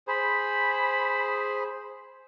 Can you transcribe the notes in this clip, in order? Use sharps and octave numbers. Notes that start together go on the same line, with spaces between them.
G#4 C5 B5